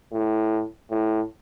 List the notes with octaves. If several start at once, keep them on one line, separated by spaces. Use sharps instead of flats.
A2
A2